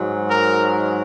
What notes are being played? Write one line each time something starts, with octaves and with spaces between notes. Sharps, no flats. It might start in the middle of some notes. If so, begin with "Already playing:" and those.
Already playing: G#2 F#3
A#4